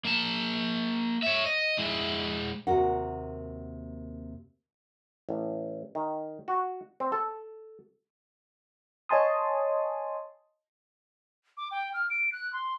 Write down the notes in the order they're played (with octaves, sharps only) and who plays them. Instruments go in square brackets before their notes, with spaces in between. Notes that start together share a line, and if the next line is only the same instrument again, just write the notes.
[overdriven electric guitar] A#3 A5
C#5 E5
D#5
G#3 E4
[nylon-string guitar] D#2 C3 A#3 F#4 A#4 F#5
[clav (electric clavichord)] A1
D#3
F#4
C4
A4
[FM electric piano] C#5 D#5 G#5 A5 C6 D#6
[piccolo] D6
G5
F6
D7
F#6
C6